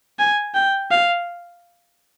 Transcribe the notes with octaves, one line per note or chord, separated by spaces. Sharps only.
G#5
G5
F5